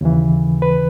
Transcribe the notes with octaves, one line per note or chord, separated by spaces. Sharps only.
D#2 C#3 E3
B4